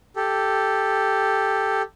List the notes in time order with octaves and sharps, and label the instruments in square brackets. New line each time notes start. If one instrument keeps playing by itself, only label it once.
[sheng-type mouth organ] G4 A4